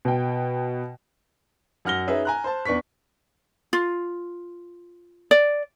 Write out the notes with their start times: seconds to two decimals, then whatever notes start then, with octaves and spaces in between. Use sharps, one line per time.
0.05 B2 G5
1.85 F#2 F#5 F6 A#6 G7
2.07 C#4 D#4 G#4 B4 E5
2.25 G#5 A#5 F#6
2.44 C5 A5
2.65 E2 D4 B4 C#6 B6
3.73 F4
5.31 D5